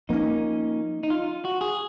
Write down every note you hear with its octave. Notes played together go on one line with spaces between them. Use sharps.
F3 A#3 C#4 D#4
D#4
F4
F#4
G#4